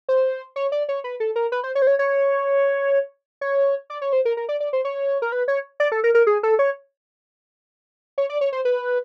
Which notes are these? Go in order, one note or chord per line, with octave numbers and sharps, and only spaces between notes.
C5
C#5
D5
C#5
B4
A4
A#4
B4
C5
C#5
C5
C#5
C#5
C#5
D5
C#5
C5
A#4
A#4
D5
D5
C5
C#5
A#4
B4
C#5
D5
A4
A#4
A#4
G#4
A4
C#5
C#5
D5
C#5
C5
B4